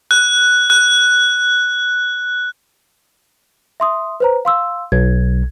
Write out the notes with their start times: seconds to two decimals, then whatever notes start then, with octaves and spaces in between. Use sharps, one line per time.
0.11 F#6
0.70 F#6
3.80 E5 C6 D#6
4.20 B4 C5 A#5
4.45 F5 C6 E6
4.92 B1 G#6